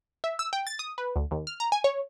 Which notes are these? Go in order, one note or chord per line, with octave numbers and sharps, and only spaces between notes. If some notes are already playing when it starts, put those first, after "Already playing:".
E5
E6
G5
A6
D#6
B4
D2
D#2
F6
A#5
G#5
C#5